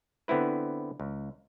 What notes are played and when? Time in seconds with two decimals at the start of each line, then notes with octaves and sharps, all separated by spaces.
0.28 D3 B3 C4 E4 B4
1.00 C#2